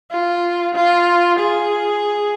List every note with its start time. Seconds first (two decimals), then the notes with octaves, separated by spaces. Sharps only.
0.11 F4
0.74 F4
1.39 G#4